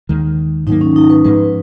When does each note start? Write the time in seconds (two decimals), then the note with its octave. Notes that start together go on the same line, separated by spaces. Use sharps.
0.09 D#2 D#3 G#3
0.67 G#2 D#3 F#3 A#3 D#4
0.81 C#4
0.96 D#4
1.10 B4
1.25 G#2 F3 G#3 B4